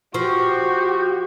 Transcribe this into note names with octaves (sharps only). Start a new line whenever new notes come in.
F3 F#4 G4 C#6